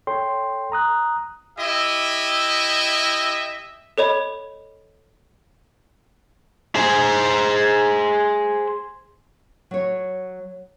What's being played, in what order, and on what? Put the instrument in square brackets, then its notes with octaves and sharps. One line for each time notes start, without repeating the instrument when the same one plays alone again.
[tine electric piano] A4 C#5 G5 C6
A#5 D#6 F#6
[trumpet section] E4 G4 D#5 E5
[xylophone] A4 C#5 D#5 B5
[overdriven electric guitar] G#4 C5
[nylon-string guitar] F#3 C#5